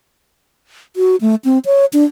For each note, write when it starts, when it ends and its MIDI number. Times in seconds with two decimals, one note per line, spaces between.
0.96 1.16 66
1.21 1.35 57
1.45 1.59 60
1.66 1.86 73
1.93 2.04 62